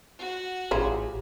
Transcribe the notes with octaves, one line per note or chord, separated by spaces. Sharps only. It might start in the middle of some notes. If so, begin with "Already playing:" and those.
F#4 F#5
A1 C#4 E4 F4 G4 G#4